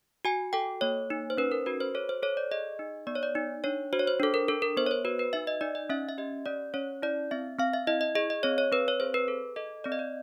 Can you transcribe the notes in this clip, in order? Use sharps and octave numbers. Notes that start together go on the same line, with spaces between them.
F#4 G#5
A4 G5
A#3 C#5
D#4
C5
C#4 B4
A#4
F#4 B4
C5
A4 C#5
C5
A4 C#5
D5
G#4 D#5
D#4
B3 D5
C#5
D5
D#4
D4 C#5
F#4 C5
C#5
C5
D4 A4
A#4
D4 A4
A#4
B3 C5
C#5
C5
F#4 B4
B4
D#4 E5
D#5
D#4 D5
D#5
C#4 E5
E5
G4 D#5
C#4 D5
C#4 C#5
E4 D5
C4 E5
C4 F5
E5
E4 D#5
D#5
G#4 D#5
D#5
C4 C#5
C#5
C4 B4
C#5
G#4 C5
B4
A4
A4 D#5
C4 D5
D#5
D5